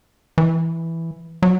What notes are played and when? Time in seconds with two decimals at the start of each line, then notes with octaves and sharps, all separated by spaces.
0.38 E3
1.42 F#3